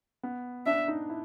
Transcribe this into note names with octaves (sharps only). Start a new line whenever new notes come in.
B3
D4 E5
D#4
E4